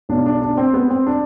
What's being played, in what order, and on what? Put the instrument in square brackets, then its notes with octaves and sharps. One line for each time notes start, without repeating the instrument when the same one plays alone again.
[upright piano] B1 B2 D4
D4
D4
C4
B3
C4
D4